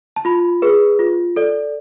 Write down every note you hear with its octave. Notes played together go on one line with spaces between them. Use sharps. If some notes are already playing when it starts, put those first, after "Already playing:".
A5
F4 B5
G#4 B4
F4
A4 D5